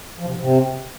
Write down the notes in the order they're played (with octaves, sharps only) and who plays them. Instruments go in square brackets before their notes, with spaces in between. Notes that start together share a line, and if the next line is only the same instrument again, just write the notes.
[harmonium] F3
C3
G#2
C3